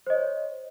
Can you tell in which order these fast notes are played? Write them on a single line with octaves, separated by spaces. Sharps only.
C5 D#5 C#5